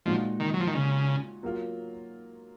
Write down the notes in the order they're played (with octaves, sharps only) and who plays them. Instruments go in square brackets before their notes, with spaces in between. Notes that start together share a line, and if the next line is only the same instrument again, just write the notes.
[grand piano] A#2 G#3 D#4 F#4 [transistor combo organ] F3
[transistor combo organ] D#3
F#3
F3
D#3
C#3
[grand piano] F#3 A#3 F4